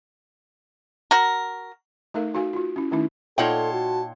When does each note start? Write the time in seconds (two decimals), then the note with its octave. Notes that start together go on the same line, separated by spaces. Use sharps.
1.11 F#4 A#4
2.14 A3 D#4 A4 A#4 F5
2.34 D#4 F#4 A4 F5 G#5
2.53 F4 F#4
2.76 C#4 E4
2.91 D#3 A3 C#4 D#4 E4
3.38 A#2 D#4 F4 A4 C#5 F#5 G5 A5
3.73 F#4